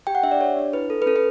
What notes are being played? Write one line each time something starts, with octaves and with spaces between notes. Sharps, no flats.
G4 G5
F#5
D4 E5
D5
G4 C#5
D4
E4 B4
A4
B4
C#4 A4
B4